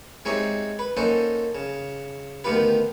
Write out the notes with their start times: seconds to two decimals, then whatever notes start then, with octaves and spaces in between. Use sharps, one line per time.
0.25 G#3 C4 D#4 G4 C#5 E5
0.79 B4
0.97 A#3 C#4 D#4 A4 C5 F#5
1.55 C#3
2.44 D2 D#3 B3 F4 G4 B4